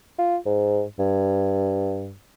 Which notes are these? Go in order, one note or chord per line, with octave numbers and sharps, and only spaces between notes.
F4
G#2
G2